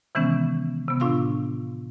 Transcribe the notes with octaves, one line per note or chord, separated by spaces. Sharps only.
C3 D#3 E3 G#3 B3 C#4
C3 B3
A2 D4 F4 F5 C6 E6